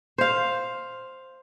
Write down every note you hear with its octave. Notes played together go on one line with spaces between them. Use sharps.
C5 F5